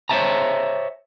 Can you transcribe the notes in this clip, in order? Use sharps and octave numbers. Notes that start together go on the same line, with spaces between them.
C5 C#5 D#5 E5 A5 A#5